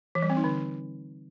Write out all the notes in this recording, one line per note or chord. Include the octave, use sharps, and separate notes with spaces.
E3
G3
C4
D#4
D3